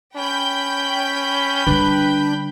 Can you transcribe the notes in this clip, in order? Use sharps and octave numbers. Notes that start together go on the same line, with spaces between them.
C#4 G5 B5 G6
D3 G3 D4 B4